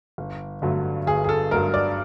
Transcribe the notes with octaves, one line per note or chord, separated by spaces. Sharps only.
G1
G2 D3 F#3 A3
G1 G#4
G#4
A4
G2 D3 F#3 A3 A#4
D5